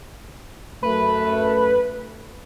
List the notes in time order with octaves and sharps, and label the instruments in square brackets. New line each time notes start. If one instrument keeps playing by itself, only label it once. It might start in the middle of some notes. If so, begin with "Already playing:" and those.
[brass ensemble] F#2 A3 [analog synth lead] B4